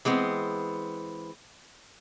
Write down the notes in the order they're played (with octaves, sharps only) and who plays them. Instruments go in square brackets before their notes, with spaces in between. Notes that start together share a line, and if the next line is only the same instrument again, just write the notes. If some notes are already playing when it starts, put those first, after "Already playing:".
[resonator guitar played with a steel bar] E3 G#3 B3 C4